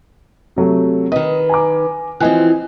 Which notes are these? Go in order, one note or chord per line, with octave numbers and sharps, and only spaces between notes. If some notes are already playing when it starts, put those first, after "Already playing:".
C3 F#3 A3
D#3 B4 D#5
G#5 A#5 D6
E3 F3 C4 D#5 G#5 F#6